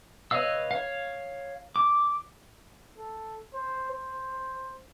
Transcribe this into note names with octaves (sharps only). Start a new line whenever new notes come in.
B4 C#5 D#5 F5 E6
C#5 F5
D6
A4
C5
C5